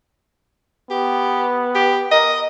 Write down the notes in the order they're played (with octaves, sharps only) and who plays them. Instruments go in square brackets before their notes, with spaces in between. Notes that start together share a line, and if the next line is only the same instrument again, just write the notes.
[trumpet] B3 [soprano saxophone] G4
[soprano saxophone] G4
[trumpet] A#4 [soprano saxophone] D#5